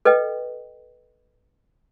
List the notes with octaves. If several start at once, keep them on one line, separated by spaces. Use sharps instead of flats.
A4 B4 D#5 G5